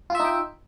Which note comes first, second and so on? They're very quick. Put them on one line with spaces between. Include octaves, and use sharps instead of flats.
F4 E5 D#4 G5